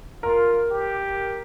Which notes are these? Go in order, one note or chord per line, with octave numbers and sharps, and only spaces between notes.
F4 A#4
G4